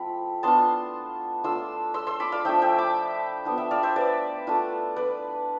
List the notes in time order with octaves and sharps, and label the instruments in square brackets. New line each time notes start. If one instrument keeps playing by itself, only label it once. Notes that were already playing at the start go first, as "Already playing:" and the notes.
Already playing: [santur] F3 A3 C4 F4 B5
B3 D4 F4 A5 C6
A3 D4 F4 C6 E6
C6 E6
C6 E6
B5 D6
D5 F5
F3 A3 D4 E5 G5
E5 G5
B5 D6
B3 D4 F4
E5 G5
D5 F5
C5 E5
B4 D5
A3 D4 F4
B4 D5